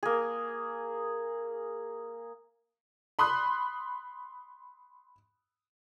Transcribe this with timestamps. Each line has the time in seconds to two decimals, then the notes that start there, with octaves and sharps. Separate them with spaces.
0.03 A#3 G#4
3.19 B5 C6 D#6 F#6